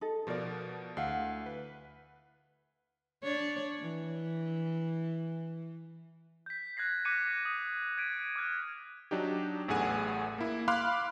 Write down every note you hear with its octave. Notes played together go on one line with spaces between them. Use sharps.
D#4 A4
B2 F3 F4 A#4 D5
D2 E4 F5 F#5
B4
D4 C#5 D5
E3
G6 B6
F#6 G#6 A#6 C7
D6 F#6 A#6 B6 C#7 D#7
D#6
G#6 B6 D7 D#7
D6 F6 F#6 G#6
F#3 D4 D#4 G4
A1 E2 A2 G#4 F#5 G#5
A#3 E4
F5 B5 C6 D6 F6 F#6